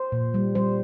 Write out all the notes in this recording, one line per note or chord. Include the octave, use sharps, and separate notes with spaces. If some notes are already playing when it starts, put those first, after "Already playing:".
Already playing: C5
A#2
G3
G3 C5